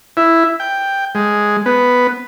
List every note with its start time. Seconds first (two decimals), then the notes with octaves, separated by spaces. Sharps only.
0.17 E4
0.60 G5
1.15 G#3
1.66 B3